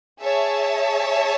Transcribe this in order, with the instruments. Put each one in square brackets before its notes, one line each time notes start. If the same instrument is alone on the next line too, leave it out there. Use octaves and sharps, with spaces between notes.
[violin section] G#4 C#5 E5 A5